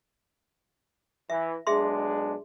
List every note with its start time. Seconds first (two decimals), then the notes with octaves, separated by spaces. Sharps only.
1.30 E3 E5
1.67 B1 G#3 D4 G#4 E5 C6